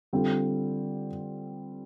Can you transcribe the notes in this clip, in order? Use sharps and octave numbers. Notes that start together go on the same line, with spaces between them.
D3 G3 C4 F4